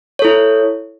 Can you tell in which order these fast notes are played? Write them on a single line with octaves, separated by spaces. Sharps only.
C#5 A4 E4